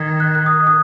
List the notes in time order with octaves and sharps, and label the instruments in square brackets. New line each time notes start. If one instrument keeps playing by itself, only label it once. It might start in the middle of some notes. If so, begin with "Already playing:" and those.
Already playing: [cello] D#3 [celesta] D#6 G#6
[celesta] F#6
F#6
D#6
D#6